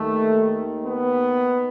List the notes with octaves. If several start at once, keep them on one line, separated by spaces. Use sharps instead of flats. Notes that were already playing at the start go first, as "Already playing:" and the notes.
Already playing: D#2 D#3 A3
B3